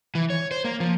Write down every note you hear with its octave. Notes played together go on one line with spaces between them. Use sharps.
E3
C#5
C5
A#3
F3